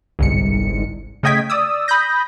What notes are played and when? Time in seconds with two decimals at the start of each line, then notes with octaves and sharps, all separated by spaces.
0.19 G1 C2 G#2 C#7
1.23 C#3 A3 D#5 G5 G#6 B6
1.50 D5 D#6 E6
1.88 B5 D#6 G6 A#6